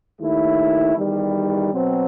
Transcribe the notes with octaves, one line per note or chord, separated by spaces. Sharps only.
D#2 D#3 A3 E4
E2 D#3 G3
B2 F#3 C4